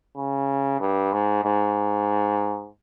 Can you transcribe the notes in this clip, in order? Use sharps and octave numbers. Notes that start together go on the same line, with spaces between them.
C#3
G2
G#2
G#2